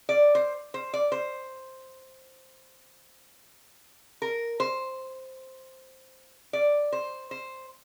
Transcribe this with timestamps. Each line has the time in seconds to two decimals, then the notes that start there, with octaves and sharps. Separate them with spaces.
0.09 D5
0.35 C5
0.74 C5
0.93 D5
1.12 C5
4.22 A#4
4.60 C5
6.53 D5
6.92 C5
7.31 C5